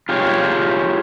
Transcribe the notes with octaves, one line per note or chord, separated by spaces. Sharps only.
F4 G4 G#4 C#5